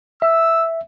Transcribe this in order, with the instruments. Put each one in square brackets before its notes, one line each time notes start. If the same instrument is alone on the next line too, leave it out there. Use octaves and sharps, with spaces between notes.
[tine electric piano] E5 [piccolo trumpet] E6